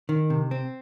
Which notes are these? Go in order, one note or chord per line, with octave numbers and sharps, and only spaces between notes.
D#3
C3
C4